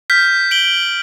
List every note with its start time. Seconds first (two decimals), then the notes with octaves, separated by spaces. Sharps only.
0.10 F6 G6 B6
0.51 D7 F#7 G7